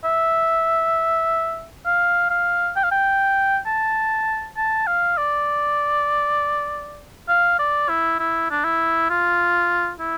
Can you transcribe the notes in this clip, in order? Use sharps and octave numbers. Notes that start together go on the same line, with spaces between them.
E5
F5
F5
G5
F5
G5
A5
A5
F5
D5
F5
D5
E4
E4
D4
E4
F4
E4